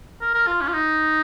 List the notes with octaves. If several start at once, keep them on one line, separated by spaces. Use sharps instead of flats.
A#4
A#4
F4
C#4
F4
D#4